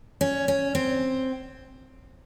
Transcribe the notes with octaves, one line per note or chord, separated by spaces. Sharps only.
C#4
C#4
C4